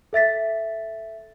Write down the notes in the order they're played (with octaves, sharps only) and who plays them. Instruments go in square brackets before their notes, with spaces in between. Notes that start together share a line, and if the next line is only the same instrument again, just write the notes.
[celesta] A4 E5 A6 B6